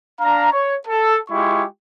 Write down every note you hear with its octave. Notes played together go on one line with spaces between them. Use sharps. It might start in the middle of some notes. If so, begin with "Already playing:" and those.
D4 F5 A#5
C#5
A4
G#3 E4 F4 G4 C#6